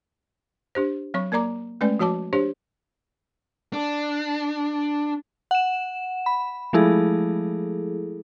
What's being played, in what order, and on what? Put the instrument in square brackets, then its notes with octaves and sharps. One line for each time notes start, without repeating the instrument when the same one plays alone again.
[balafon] D4 G4 C5
F#3 C4 C#5 C#6
A#3 A#4 D5 A#5 D6
G#3 A3 C#4 B4 D5 G#5
F3 F#4 C#5 A5 D6
D4 G4 C5 C#5
[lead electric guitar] D4
[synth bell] F#5 E7
B5
F3 G#3 A3 E4 G#4 A4